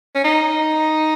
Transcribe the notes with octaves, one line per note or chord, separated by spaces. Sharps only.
C#4
D#4